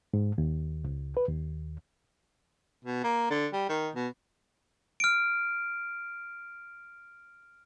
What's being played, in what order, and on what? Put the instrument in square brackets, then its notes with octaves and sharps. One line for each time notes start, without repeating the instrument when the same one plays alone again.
[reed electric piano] G#2
D#2
C#2
B4
D#2
[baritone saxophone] B2
A#3
D3
G3
D#3
B2
[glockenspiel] F6 D7